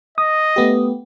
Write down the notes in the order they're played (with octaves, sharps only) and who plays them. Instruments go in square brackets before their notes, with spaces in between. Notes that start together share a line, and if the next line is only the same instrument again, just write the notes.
[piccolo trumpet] D#5 [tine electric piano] D#6
[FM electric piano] A3 B3 G4